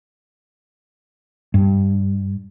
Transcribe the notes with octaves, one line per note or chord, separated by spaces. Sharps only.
G2